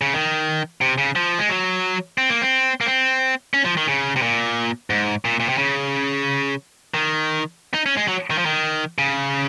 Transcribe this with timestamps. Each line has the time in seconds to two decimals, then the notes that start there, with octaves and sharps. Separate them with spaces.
0.01 C#3
0.13 D#3
0.81 C3
0.98 C#3
1.16 F3
1.39 G#3
1.49 F#3
2.18 C4
2.30 A#3
2.41 C4
2.81 A#3
2.86 C4
3.54 C#4
3.65 F3
3.77 D#3
3.88 C#3
4.16 C3
4.22 A#2
4.90 G#2
5.25 A#2
5.40 A#2
5.49 C3
5.58 C#3
6.94 D#3
7.74 D#4
7.86 C#4
7.97 G#3
8.08 F#3
8.31 D#3
8.38 F3
8.46 D#3
8.98 C#3